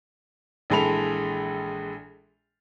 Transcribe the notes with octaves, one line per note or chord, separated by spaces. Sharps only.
A#1 E3 G#3 A4 B5 F7